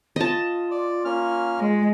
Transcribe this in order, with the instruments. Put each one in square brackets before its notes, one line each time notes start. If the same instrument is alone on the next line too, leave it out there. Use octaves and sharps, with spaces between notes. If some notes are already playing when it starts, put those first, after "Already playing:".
[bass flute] F4 [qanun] D#5 A5
[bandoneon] D5
A#3 C#4 F6
[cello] G#3